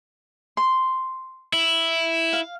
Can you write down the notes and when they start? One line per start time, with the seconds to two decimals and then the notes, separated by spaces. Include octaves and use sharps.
0.57 C6
1.53 E4
2.33 F5